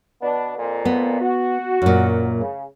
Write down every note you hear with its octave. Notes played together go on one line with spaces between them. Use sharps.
B2 B3 D4
F2 A#2
B3
F#4
F#2 A#2
C#3